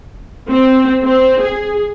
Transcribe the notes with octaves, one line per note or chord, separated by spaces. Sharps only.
C4
C4
G#4